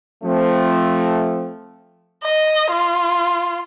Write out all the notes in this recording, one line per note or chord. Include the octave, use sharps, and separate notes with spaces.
F3 A3 C4
D#5
F4